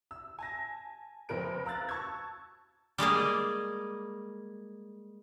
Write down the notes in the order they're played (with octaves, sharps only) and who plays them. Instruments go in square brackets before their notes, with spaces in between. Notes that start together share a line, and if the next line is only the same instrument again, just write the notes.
[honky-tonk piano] E6
G#5 A5 A#6
F#1 F2 C4 A#4 B4 D7
F5 A#5 E6 F#6 A6
A5 C#6 E6 G#6
[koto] G3 G#3 A#3 G#4